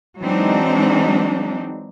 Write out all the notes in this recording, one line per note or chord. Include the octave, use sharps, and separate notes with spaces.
E3 F#3 G#3 C4 D4 D#4